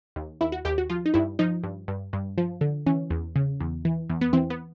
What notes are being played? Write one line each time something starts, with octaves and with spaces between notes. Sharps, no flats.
D#2
D#2 E4
F#4
D#2 G4
F#4
F3 F4
D#4
G2 E4
F3 D#4
G2
G2
G2
F3
D3
E3 C#4
E2
C#3
E2
E3
E2
B3
E3 C4
B3